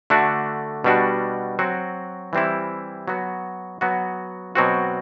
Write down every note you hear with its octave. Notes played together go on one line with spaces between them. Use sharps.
D3 A3 D4 F#4
B2 G3 D4 F#4
F#3 C4 F#4
E3 G3 C4 E4
F#3 B3 F#4
F#3 B3 F#4
B2 F#3 C4 F#4